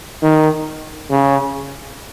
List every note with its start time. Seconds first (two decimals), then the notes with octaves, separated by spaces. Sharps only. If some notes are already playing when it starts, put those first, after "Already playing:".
0.23 D#3
1.10 C#3